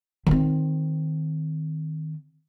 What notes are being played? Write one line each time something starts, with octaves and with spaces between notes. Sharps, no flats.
D#3 C4